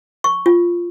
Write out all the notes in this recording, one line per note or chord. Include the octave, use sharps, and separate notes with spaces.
C#6
F4